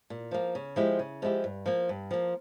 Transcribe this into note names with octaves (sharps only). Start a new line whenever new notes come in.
A#2
F3 A#3
C#3
F3 G#3 E4 G4
C#3
F3 G#3 E4 G4
G2
F3 A#3
G2
F3 A#3